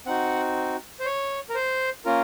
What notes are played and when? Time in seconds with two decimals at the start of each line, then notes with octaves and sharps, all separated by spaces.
0.06 C4 D#4 F#4 F#5
1.00 C5
1.05 C#5
1.49 A#4
1.55 C5
2.05 A#3 C#4 F4 A#4